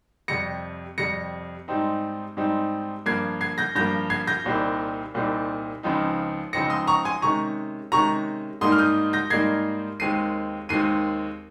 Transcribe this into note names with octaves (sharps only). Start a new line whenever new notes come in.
F2 C3 G3 A#6 C#7
F2 C3 G3 A#6 C#7
G#2 G3 C4 D#4
G#2 G3 C4 D#4
G2 F3 A#3 G#6 C7
G#6 C7
G6 A#6
G2 F3 A#3 G6 A#6
G#6 C7
G6 A#6
C2 A#2 G3 C4 D#4
C2 A#2 G3 C4 D#4
C#2 C#3 F3 C4 D#4
C#2 C#3 F3 C4 D#4 A#6 C#7
C6 D#6
A#5 C#6
G#5 C6
C3 D#3 G#3 C#4 A#5 C#6
C3 D#3 G#3 C#4 A#5 C#6
G#2 G3 A#3 D#4 C6 D#6
F6
D#6 G6
G6 A#6
G#2 G3 A#3 D#4 G#6 C7
D#2 D#3 G#3 C4 C7 D#7
D#2 D#3 G#3 C4 C7 D#7